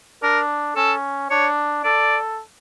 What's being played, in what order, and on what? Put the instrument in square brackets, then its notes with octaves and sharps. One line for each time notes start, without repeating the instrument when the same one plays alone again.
[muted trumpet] D4 [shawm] A#4
[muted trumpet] C#4 [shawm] A4
[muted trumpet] D4 [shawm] C#5
[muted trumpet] A4 [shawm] D5